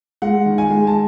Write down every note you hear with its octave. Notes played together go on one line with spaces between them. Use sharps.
G#3 F#5
D#3
G#5
G#3
A5